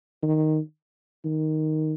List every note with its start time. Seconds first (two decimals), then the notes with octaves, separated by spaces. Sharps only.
0.23 D#3
1.25 D#3